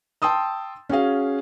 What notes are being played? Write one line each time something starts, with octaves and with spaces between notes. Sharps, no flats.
G5 A5 C6 D#6 E6
C#4 F#4 G#4 F5